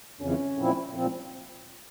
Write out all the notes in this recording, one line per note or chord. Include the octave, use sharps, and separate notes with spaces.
F2 C#3 E3 C#4
A#2 F3 C4 E4
A#2 F3 C4